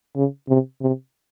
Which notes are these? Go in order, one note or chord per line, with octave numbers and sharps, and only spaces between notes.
C#3
C3
C3